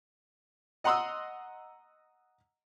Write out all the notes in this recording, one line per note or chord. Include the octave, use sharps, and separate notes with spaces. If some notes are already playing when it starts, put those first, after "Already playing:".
D#5 F#5 A#5 C6 D#6 E6